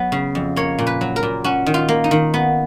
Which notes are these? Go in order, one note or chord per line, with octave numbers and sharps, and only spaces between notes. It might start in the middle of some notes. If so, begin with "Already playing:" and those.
Already playing: F#3 B3
C#3
F2
A#3 C#5
A#2
B4
F#3
A#4
A#2
C#4 F#4
D#3
F4
A#3
D#4
D#3
B3